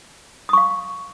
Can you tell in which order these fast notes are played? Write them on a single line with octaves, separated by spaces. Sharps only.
D#6 C#6 F5